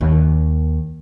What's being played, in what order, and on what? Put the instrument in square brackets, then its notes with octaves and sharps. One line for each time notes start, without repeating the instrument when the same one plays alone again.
[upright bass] D#2